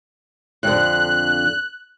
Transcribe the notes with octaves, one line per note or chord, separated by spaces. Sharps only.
F2 D3 F#6